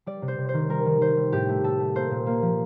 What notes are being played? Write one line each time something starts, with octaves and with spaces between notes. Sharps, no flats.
G3 D5
C3
C5
C3
C5
D#3
G3 A#4
D#3
D#3 C5
G3
A2 G4
A3
A2 A4
A3
A#3 C5
A#2
A#3
F3